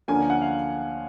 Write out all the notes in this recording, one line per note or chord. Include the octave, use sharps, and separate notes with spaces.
D2 D3 F3 A#3 C#4 G#5
F#5
F5